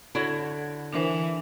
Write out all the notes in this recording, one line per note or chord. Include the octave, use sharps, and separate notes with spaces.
D3 E4 F#4 C#5
E3 D4 A#4 C5